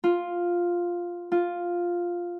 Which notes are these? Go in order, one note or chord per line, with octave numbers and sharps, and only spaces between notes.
F4
F4